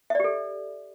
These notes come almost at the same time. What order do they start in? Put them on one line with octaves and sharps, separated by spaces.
E5 D5 G4 A4